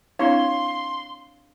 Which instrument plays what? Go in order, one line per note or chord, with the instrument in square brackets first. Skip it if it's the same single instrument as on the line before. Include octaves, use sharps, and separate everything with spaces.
[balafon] C4 D4 E4 [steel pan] C#5 [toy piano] F5 [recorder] C6